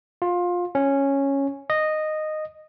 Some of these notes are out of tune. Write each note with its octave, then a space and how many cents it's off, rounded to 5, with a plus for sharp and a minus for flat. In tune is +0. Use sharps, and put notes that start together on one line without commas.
F4 +20
C#4 -5
D#5 -10